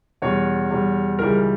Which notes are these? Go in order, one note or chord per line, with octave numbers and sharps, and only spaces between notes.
E2 B2 G3 C#5
E2 B2 G3
C#2 C#3 E3 G3 A#4